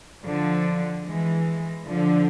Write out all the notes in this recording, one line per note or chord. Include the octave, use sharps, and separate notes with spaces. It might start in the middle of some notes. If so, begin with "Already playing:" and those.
D3 F3
E3 G#3
D3 F3